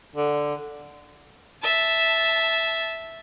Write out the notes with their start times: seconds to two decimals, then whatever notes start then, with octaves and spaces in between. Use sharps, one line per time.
0.16 D3
1.62 E5 A5